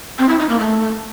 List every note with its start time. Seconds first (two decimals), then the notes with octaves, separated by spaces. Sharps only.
0.19 C4
0.29 E4
0.39 D#4
0.49 A#3
0.59 A3